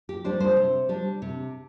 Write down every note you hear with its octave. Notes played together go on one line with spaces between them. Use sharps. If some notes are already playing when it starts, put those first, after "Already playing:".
G4
G3 D4 C5
C5
C3
G3 D4
C3